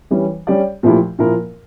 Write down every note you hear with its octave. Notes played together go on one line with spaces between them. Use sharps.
E3 G3 C#4 E4
G3 C#4 G4 D5
A#2 F3 A3 E4 G4
A#2 F3 A#3 E4 A#4